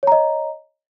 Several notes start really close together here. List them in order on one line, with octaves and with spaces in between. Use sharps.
C#5 A#5 D#5